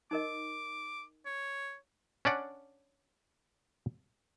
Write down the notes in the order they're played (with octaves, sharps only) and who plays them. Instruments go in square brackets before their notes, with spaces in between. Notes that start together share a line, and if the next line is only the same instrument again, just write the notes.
[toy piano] D#4 A#4 D#5 [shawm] D6
[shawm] C#5
[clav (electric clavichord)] C#4 D4 D5 F#5